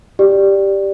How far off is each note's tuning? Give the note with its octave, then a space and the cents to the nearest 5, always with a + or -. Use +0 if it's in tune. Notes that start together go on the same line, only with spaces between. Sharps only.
G4 +0 D5 +0